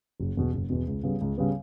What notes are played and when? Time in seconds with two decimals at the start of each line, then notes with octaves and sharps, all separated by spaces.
0.20 F#1
0.37 E2 B2
0.53 F#1
0.70 E2 B2
0.87 C#2
1.03 C#3 G3 B3
1.21 C#2
1.38 C#3 G3 B3